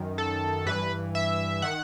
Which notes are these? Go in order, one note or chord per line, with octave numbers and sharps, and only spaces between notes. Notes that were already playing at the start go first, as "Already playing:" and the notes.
Already playing: F#2 D#3
A4
G2 E3 B4
E5
D#3 F#5